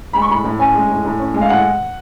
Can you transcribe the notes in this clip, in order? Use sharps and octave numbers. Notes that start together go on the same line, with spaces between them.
G#3 B5
C#6
A2 B5
A2
C#4 G#5
G#3
A2
A2
C#4
G#3
F5
A2 F#5